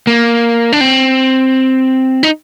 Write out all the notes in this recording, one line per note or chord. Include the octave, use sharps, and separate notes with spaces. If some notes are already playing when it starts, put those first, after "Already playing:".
A#3
D4
C4
D#4